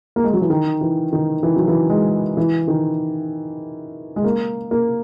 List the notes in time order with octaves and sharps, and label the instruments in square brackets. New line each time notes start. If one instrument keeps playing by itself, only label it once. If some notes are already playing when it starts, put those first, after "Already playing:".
[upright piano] A#3
G#3
F#3
E3
D#3
E3
D#3
E3
F#3
E3
G#3
E3
D#3
G#3
A#3
A#3